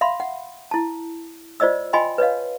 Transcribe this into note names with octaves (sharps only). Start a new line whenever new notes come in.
E5 F5 B5 C6
F#5
E4 A5
F4 C5 D5 D#5 E6
F4 D#5 G5 G#5 B5 C6
B4 C#5 D#5 F5